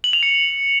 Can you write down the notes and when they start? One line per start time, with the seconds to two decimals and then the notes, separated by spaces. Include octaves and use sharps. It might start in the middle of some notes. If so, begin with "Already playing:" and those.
0.04 F#7
0.13 F7
0.23 C#7